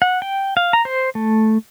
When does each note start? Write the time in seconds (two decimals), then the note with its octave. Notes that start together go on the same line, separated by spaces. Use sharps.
0.02 F#5
0.22 G5
0.57 F5
0.73 A#5
0.85 C5
1.15 A3